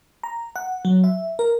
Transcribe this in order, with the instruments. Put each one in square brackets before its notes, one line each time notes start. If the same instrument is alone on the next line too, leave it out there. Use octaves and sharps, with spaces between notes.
[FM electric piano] A#5
F#5
F#3
E5
A#4